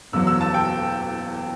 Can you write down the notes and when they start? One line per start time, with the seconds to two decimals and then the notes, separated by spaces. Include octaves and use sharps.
0.12 F#1 E2 B2 F#3 E6
0.27 E6
0.41 A5
0.54 G5